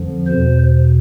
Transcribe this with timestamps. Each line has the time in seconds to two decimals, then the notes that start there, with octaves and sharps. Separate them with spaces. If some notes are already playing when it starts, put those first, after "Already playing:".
Already playing: F2 D3 F3
0.27 E2 B2 C5